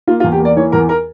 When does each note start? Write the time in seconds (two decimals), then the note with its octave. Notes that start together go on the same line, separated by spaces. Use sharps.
0.07 A#3 F4
0.20 F4
0.24 E2
0.32 G4
0.40 A#3
0.45 D5
0.56 E3 C#5
0.72 E2 A#4
0.89 A#4